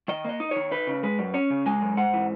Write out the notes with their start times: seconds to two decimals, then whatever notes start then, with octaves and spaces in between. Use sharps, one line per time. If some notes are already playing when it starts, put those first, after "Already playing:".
0.08 D#3 D#5
0.24 A#3 D#5
0.40 D#4
0.51 D#3 C#5
0.71 D#4 B4
0.87 C#3
1.03 G#3 B4
1.19 F#2
1.34 C#4 C#5
1.50 C#3
1.66 G#3 G#5
1.82 F#2
1.97 G#2 F#5
2.13 E3